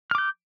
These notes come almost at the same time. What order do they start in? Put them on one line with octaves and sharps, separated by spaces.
F6 D6 G6